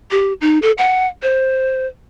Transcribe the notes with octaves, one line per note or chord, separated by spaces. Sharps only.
G4
D#4
A4
F#5
C5